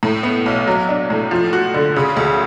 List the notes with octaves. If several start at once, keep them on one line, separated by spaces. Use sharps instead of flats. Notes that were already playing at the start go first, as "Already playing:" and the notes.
A2
B3
B1
F#3
D4
A2
F3
F#4
D3
C#3
D2